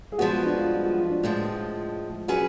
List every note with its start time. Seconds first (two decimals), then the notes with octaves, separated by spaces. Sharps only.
0.12 G#4
0.18 F3 G#3 B3 F#4
0.32 F4
0.45 D4
0.58 F4
0.72 F4
0.85 F#4
0.98 F4
1.10 D4
1.23 A2 F3 G#3 F4
2.28 F#3 C#4 F#4 G#4 B4